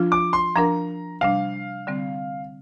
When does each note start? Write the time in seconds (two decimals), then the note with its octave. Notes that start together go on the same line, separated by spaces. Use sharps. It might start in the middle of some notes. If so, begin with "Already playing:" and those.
Already playing: F3 D4 F4
0.12 D6
0.33 C6
0.56 F3 D4 A#4 A#5
1.21 C3 G3 D4 F5
1.87 D3 G3 C4